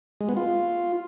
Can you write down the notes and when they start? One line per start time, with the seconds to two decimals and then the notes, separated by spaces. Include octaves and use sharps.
0.21 G#3
0.29 B3
0.37 F4